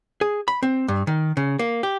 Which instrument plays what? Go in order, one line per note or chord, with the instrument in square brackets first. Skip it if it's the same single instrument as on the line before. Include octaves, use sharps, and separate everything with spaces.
[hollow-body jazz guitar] G#4
B5
C4
G2
D#3
C#3
A#3
G4